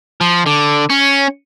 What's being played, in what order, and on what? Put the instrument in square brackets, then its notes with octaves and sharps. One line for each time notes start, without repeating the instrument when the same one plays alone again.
[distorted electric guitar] F3
D3
C#4